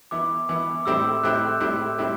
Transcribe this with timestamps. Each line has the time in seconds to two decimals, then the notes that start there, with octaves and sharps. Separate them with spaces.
0.11 E3 B3 E4 D6
0.49 E3 B3 E4
0.80 D6
0.86 A2 G3 C4 E4 E6
1.05 E6
1.23 A2 G3 C4 E4 F#6
1.35 G6
1.46 F#6
1.60 A2 G3 C4 E4
1.98 A2 G3 C4 E4